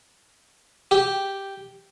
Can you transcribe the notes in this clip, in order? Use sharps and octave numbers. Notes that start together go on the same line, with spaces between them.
G4